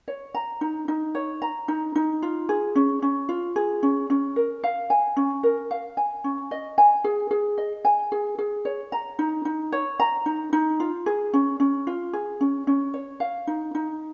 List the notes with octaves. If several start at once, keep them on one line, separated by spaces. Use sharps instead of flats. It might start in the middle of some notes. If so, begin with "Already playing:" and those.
C#5
A#5
D#4
D#4
C#5
A#5
D#4
D#4
F4
G#4
C#4
C#4
F4
G#4
C#4
C#4
A#4
F5
G#5
C#4
A#4
F5
G#5
C#4
D#5
G#5
G#4
G#4
D#5
G#5
G#4
G#4
C#5
A#5
D#4
D#4
C#5
A#5
D#4
D#4
F4
G#4
C#4
C#4
F4
G#4
C#4
C#4
C#5
F5
D#4
D#4